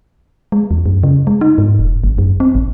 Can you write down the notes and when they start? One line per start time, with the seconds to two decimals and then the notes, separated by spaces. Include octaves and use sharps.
0.52 G#3
0.71 E2
0.86 F#2
1.03 C#3
1.27 G#3
1.41 D#4
1.58 G#2
1.79 E1
2.04 G#1
2.18 F#2
2.40 C4
2.55 A1